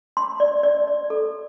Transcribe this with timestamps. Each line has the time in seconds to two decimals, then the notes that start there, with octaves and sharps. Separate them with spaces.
0.17 C6
0.40 D5
0.63 D5
0.87 D5
1.10 A4